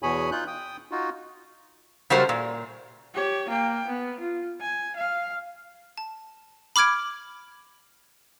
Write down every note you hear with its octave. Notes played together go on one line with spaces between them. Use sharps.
E2 B2 G#4 C#5 G#5 B5
D#4 F4 F#6 G6
G5 D#6
D#4 F4 F#4
C#3 F#3 G3 A3 A#4 C5
A#2
G4 C#5
A#3 G5
B3
F4
G#5
F5
A5
B5 D6 F6 G#6 D7